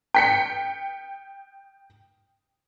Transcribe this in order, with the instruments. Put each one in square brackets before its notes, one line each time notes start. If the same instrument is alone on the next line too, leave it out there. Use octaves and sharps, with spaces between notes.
[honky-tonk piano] G5 B6 C#7